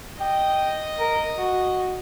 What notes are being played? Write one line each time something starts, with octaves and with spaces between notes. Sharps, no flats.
D#5 G5
A#4
F#4